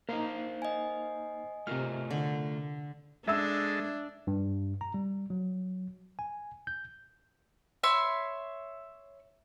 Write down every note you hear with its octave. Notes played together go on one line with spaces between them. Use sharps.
A#3 D#4 A#4 C5 F5
D#5 G#5
C3 A3 F4 A#4 F6
D3
G#3 D4 A4 E5 E6
G2
A#5
G3
F#3
G#5
G6
C#5 E5 B5 C6